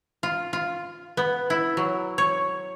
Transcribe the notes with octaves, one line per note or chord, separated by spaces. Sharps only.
F4
F4
B3
E4
F#3
C#5